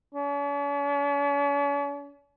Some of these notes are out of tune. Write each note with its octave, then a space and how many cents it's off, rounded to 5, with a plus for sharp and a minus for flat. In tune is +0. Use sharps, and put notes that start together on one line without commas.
C#4 +45